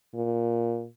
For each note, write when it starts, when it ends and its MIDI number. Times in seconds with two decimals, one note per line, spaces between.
0.14 0.86 46